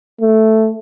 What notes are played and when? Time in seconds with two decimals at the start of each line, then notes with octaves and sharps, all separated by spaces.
0.21 A3